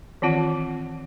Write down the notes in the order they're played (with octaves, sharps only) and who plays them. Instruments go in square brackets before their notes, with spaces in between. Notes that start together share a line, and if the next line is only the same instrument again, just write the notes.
[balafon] D#3 E3 C4 F4 F#5